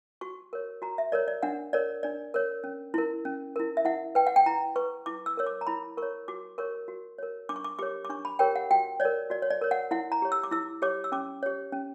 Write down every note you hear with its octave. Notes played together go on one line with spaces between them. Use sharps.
F#4 C#6
A#4 C#5
F#4 A#5
E5
A#4 C#5 D5
D5
D4 F#5
A#4 C#5 D5
D4 D5
A#4 C#5
C#4
E4 A#4
C#4
E4 A#4
E5
E4 F#5
B4 G5
F#5
G5
E4 A#5
B4 C#6
E4 D6
E6
A#4 C#5 E6
D6
A#5
E4 B5
A#4 C#6
C#5
F#4 D6
A#4 C#5 C#6
F#4
A#4 C#5
D4 D6
C#6
D6
G4 A#4 C#5 D6
D6
D4 C#6
B5
G4 A#4 C#5 G5
F#5
F#4 G5
C#5 D5
A#4
F#4 D5
C#5
D5
A#4 C#5
F#5
E4 F#5
A#5
G4 C#5
E6
D6
E4 E6
G4 C#5 D6
E6
C#4 D6
G4 C#5
C#4